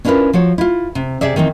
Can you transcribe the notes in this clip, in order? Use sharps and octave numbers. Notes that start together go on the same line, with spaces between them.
C#4 D4 E4 F4 A#4 B4
F3 F#4 C#5
E4 F4
C3
C3 G#4 D5 E5
D#3 E3 C4 D#4